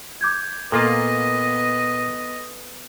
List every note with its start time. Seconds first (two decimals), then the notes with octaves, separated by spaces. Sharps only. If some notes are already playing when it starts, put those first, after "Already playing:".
0.21 D6 G6 G#6
0.72 A#2 A#3 B3 F4 A4 D#5 F5